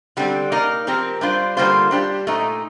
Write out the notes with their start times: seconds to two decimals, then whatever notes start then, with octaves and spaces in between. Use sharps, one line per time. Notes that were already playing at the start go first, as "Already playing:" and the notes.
0.17 D3 G3 C4
0.52 A#3 D#4 A#4 D5
0.87 F3 C4 G4 A#4
1.21 G3 D4 F4 C5
1.57 D3 G3 A#3 F4 C5
1.91 G3 D4 G4 C5
2.27 A#2 A3 D#4